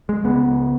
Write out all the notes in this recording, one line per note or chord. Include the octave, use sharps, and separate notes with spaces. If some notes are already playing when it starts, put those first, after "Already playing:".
G#3
C#2 C#3 B3